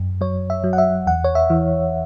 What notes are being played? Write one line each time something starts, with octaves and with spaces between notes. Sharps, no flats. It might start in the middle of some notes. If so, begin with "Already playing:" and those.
Already playing: F#2
F#3 C#5
E5
F#3
F#5
E5
E2 F#5
C#5
E5
E3